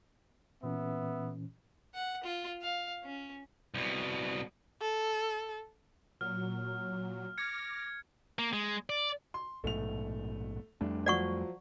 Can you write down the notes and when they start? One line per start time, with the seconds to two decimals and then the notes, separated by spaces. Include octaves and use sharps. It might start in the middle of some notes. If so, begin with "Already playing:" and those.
0.63 A#2 E3 B3 C#4 E5
1.94 F#5
2.23 F4
2.62 F5
3.04 C#4
3.74 C2 B2
4.81 A4
6.21 A#2 F#3 F6
7.38 D6 F6 G#6 A#6 C#7
8.39 A#3
8.53 G#3
8.90 D5
9.34 C6
9.64 A#1 G#2 B2 A3 F7
10.81 F2 G3 A3 D4
11.06 F3 F#3 D5 F#5 C#6